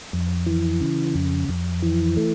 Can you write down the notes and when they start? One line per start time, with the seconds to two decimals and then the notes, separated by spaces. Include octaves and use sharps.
0.13 F2
0.46 E3
0.81 C#3
1.15 F2
1.49 F2
1.82 E3
2.17 A3